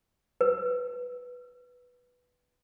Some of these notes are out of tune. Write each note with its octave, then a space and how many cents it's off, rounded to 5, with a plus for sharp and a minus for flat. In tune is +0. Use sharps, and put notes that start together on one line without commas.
B4 +0 E6 +0